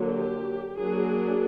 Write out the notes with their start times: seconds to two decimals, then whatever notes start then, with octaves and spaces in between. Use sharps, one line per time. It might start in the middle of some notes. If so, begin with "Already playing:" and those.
Already playing: D3 F#3 A#3
0.12 G4
0.78 F#3 A#3 D4 G#4